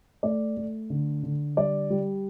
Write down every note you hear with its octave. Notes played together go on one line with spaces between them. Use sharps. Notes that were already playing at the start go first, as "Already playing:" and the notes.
A3 D5
A3
D3
D3
G3 D5
G3